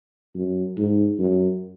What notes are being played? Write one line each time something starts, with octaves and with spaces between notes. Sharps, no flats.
F#2
G#2
F#2